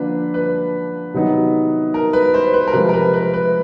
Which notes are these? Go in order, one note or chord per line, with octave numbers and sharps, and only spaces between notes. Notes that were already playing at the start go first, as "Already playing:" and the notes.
Already playing: D3 F3 A#3 D4 B4
B4
C3 D#3 F#3 B3 D#4
A#4
B4
C5
B4
A#4
C3 F3 G#3 B4
A#4
B4
B4
B4